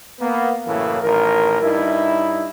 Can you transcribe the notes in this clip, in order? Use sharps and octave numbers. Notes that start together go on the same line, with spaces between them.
A#3 B3
F#2 A2 C#3 E3 A#3
A1 D#3 A#4
G2 D#4 E4